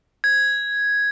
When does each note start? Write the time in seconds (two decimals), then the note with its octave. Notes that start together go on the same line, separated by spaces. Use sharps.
0.24 G#6